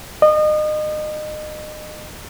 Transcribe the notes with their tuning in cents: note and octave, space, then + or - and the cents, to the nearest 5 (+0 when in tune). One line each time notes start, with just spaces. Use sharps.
D#5 -30